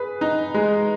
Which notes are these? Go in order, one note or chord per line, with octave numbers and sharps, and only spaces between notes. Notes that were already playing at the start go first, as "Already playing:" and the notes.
Already playing: G#4 B4
D#4
G#3